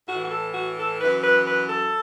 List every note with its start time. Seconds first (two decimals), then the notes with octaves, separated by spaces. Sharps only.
0.08 A2 E3 F#4
0.25 F#4
0.32 A4
0.54 F#4
0.78 A4
1.01 F#2 E3 B4
1.24 B4
1.47 B4
1.70 A4